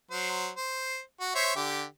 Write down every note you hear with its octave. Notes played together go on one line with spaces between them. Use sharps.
F#3 C5
C5
F#4
C5 C#5 E5
D3 G4